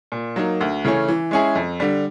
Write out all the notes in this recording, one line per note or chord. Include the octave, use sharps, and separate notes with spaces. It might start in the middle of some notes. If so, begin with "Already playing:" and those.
A#2
F#3 A#3 D#4
D2
C#3 E3 A3 C#4
E3
G#3 C#4 E4 G#4
F2
D3 G3